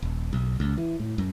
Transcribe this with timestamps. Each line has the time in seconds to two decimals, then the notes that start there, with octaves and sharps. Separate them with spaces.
0.02 D#1
0.33 B1
0.60 C#2
0.78 E3
0.99 A2
1.18 F#2